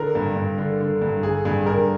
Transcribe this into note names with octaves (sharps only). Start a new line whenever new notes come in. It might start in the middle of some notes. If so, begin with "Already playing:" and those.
Already playing: D3 A#4
G2
G2
D3
D3
G2
D3 G#4
G2 G#4
G2 A#4